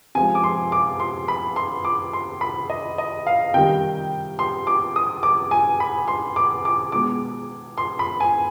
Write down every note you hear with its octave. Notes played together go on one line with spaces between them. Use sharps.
C3 F3 G#3 G#5
D6
C6
D6
C6
B5
C6
D6
C6
B5
D#5
D#5
F5
C3 D#3 G3 G5
C6
D6
D#6
D6
G#5
B5
C6
D6
D6
B2 G#3 D6
C6
B5
G#5